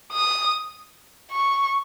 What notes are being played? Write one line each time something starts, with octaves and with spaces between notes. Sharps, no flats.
D#6
C#6